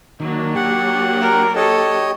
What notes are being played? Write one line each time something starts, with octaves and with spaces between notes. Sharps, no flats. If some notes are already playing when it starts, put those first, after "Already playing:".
D#3 F#3 A#3 D4
G4 F#5
A#4
G4 A4 C#5 D#5